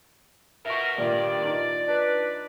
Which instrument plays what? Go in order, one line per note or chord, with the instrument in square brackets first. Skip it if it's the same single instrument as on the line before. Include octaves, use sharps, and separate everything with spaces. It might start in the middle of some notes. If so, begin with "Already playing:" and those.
[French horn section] B2 A#4 [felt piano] E5 C#6
[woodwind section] G2 D#3 [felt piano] A#2 [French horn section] D5
[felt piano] D#4 F4
[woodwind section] D4 B4